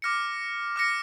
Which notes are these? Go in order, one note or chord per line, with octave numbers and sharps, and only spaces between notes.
D6 F6 A#6 C#7
D6 F6 A#6 C#7